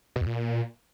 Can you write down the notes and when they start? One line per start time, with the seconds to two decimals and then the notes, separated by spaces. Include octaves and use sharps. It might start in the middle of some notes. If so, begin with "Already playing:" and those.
0.16 B2
0.21 E2
0.26 A#2